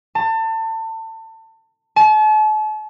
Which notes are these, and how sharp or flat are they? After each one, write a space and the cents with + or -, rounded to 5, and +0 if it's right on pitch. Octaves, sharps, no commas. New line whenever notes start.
A5 +30
A5 -40